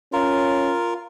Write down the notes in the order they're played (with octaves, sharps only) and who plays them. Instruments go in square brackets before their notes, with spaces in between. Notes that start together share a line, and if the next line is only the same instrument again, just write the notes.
[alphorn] C#4 [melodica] F4 A#4